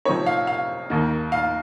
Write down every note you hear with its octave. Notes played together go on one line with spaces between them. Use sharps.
C3 F3 C4 D#4 C#5
F5
F5
D#2 D#3 A#3 D#4
F5